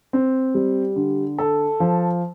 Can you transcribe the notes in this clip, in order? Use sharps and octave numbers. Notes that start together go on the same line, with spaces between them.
C4
G3
D3
A4
F3